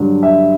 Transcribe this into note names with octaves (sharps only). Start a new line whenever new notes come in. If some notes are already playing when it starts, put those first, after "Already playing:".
Already playing: G2 D3 F#3
E5